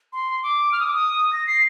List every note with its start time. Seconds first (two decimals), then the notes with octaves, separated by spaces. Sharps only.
0.13 C6
0.43 D6
0.72 F6
0.80 D#6
0.87 D6
0.94 D#6
1.33 A#6
1.47 C7